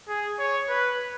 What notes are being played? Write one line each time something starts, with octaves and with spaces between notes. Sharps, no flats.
G#4
C#5
B4